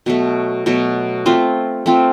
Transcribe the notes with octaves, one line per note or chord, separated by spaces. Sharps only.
B2 F#3 A3
B2 F#3 A3
A3 C4 F4
A3 C4 F4